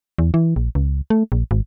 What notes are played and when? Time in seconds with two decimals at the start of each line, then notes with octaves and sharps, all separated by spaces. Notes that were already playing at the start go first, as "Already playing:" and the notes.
0.18 E2
0.34 E3
0.56 A#1
0.75 C#2
1.10 A3
1.32 A#1
1.51 G#1